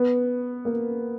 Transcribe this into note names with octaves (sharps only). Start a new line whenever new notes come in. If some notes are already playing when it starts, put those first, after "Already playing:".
Already playing: B3
A#3